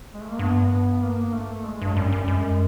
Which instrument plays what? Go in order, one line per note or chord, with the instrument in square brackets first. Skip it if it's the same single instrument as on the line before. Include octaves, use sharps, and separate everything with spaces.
[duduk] G#3
A3
A#3
[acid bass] G2 [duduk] B3
[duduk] B3
A#3
A3
A3
G#3
[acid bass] G2
[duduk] F#3
[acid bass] F#2 [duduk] G3
[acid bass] F#2
[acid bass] F#2 [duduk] G#3